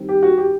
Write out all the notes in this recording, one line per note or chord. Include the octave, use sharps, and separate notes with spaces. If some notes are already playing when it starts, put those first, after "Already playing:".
Already playing: D#3 G3 C4
G4
F#4
G4